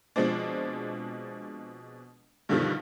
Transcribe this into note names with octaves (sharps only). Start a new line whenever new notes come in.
B2 F3 G#3 C4 D4
G2 B2 D3 D#3 F3 G3